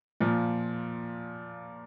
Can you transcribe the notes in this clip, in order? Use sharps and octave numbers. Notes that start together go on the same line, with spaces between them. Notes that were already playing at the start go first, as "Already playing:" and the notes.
A#2 F3